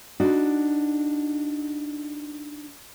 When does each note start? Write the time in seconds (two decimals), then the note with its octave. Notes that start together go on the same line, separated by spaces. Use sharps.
0.20 D4 D#4 F#4